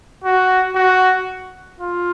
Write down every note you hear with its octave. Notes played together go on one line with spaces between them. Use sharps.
F#4
F#4
F4